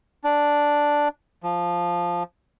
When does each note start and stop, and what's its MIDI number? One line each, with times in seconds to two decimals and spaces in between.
0.24 1.08 62
1.43 2.23 53